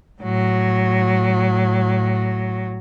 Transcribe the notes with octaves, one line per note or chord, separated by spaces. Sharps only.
A2 F#3